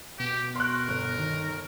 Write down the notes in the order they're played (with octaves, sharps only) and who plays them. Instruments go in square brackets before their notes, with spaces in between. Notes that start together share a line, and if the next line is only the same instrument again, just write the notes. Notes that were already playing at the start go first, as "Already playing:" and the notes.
[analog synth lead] B2 [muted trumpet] G4
[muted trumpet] A#4 [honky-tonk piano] C6 C#6 F#6
[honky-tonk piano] G1
[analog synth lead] D#3